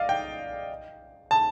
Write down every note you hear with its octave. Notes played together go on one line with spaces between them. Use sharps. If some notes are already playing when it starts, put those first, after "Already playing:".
Already playing: D5 D#5 F5
G5
A5